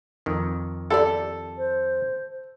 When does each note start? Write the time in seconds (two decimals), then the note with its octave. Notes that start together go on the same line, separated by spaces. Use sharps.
0.26 F2 D#3
0.90 E4 G4 A4 D5
1.58 C5